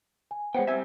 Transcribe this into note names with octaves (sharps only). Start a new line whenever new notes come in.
G#5
G#3 B3 C5 C#5 F#5 G5
C2 C3 G3 E5 G#5